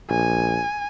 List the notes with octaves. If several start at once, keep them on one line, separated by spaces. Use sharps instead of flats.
A#1 G#5